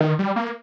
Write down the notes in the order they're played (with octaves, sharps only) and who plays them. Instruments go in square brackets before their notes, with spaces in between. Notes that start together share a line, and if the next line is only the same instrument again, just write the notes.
[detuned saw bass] D#3
G3
A#3